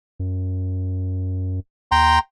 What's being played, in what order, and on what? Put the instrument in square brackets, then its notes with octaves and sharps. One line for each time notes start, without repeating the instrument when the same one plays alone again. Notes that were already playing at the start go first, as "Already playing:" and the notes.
[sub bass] F#2
[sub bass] D#2 [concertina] G5 A#5 C6